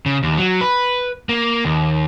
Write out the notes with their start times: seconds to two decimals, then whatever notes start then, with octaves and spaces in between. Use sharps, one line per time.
0.06 C#3
0.23 D#2
0.38 F#3
0.61 B4
1.29 A#3
1.65 D#2